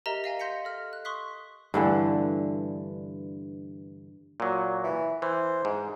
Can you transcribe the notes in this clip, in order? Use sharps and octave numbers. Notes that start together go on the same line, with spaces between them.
G4 A#4 D#5 E5 A#5
D#5 F5 G#5
C6 G6 A#6 B6 C#7 F7
A4 D#5 F6
F#6
C6 C#6 D#6 F#6 B6 C7
G2 D3 E3 A3
A#2 F#3
E3
E3 C5
G#2